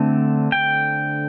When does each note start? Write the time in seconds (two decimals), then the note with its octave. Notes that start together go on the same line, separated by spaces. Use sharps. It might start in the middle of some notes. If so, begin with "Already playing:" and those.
Already playing: D3 A3 C4
0.52 G5